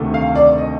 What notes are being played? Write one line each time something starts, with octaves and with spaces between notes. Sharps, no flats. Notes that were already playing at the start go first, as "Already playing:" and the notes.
Already playing: D2 C3 D#3 A3
F5
D5
D#5